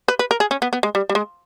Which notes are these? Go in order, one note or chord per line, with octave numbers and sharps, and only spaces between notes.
B4
B4
A#4
G#4
C#4
B3
B3
G#3
G3
G3
G#3